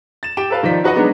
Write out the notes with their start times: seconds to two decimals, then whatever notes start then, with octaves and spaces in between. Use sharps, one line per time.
0.23 A6 E7
0.37 G4 G5 D7 E7
0.50 A4 B4 F5
0.63 D#3 F3 D5 B6
0.83 D#4 F#4 B4 D#5 F#5
0.95 F#3 G#3 B3 D4 D#4